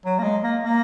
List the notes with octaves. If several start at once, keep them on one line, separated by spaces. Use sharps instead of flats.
F#3
A#3
G#3
A#3
A#3